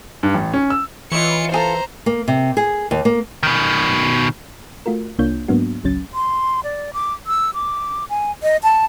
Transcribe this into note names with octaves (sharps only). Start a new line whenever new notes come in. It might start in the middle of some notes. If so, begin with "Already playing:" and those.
G2
A1
C#4
E6
E3 F4 C#5 D#5 C#7
F4 G#4 A4 C5 A#5
A#3
C3
G#4
D#2
A#3
B2 D#3
A3 F4 F#4 A#4
C2 A#3 D4 F4 C#5 G6
G#2 F#3 A#3 B3 D4 F#4
G#1 C#2 F#3 C#4 A6
C6
D5
D6
E6
D6
G#5
D#5
A5